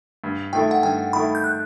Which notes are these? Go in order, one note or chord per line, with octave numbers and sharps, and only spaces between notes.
G2
D#3 A3 E4 G5
F#5
G2 G5
D#3 A3 E4 B5
G6
F#6